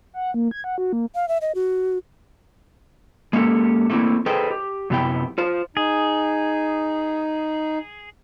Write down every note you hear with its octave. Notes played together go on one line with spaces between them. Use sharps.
F#5
A#3
G#6
F#5
F#4
A#3
F5
E5
D#5
F#4
G#3 A#3 C#4 G4 A4
A3 A#3 C4 C#4 E4
G#4 A4 B4 C5 D#5 G5
G4
F#2 C3 B3 E4 G5
F4 C5
D#4 G#4